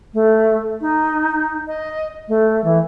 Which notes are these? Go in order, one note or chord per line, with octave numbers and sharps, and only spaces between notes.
A3
D#4
D#5
A3
E3